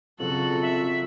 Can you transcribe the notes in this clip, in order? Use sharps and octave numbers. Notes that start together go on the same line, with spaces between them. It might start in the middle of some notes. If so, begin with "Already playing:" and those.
F2 C#3 F#3 F#4 A4 F#7
E5